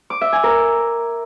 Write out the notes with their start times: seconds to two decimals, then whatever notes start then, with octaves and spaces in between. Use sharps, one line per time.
0.10 D6
0.21 E5
0.32 G#5
0.44 A#4